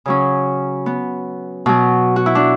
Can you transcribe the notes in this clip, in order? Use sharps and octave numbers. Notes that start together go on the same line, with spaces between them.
C#3 F#3 C#4
B3
B2 F#3
F#4
E4
D4